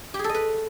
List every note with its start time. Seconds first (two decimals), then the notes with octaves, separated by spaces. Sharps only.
0.14 G4
0.19 G#4
0.24 A4
0.29 D#5
0.34 B4